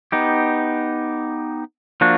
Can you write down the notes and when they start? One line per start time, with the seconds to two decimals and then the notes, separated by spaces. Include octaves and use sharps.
0.12 B3 D#4 G4
2.01 F3 A#3 D4 F#4